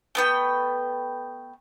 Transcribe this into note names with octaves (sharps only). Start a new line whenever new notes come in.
A3 B3 G5